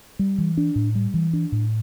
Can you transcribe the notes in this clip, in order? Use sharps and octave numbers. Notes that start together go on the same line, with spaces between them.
G3
E3
D4
A2
G3
E3
D4
A2